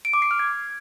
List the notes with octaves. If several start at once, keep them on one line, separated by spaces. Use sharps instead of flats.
D7
D6
C7
F6
G#6